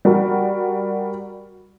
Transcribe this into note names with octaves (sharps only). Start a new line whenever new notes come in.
G3 F#4 A#4